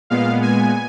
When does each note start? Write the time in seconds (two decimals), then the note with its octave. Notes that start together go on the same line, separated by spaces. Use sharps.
0.10 A#2 G#3 B3 F5
0.42 G#5